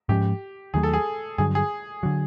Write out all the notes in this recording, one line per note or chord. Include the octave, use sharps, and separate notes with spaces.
G#2 F3 G#3 C#4 G4
D#2 D#3 F#3 A3 G#4
A4
G#4
G2 D3 F#3 G#4
G#4
D3 F#3